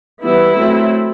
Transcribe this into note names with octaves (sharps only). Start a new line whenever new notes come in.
E3 G3 B3 E4
F#3 A3 C4